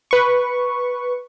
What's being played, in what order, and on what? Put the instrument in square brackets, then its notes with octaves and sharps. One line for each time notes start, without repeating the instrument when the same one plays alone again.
[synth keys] B4 C#6